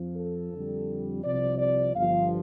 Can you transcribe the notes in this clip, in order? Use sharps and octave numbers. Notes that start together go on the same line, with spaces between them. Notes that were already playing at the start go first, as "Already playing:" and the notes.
Already playing: F2 F3
A4
F2 D3 G3
C2 C3 F3 D5
D5
G1 G2 F3 F5